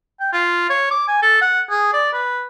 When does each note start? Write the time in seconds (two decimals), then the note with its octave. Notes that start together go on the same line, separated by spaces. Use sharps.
0.20 G5
0.33 F4
0.70 C#5
0.91 D6
1.08 G#5
1.22 A4
1.41 F#5
1.70 G#4
1.93 D5
2.13 B4